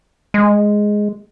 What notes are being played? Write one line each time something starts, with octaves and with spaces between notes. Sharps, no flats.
G#3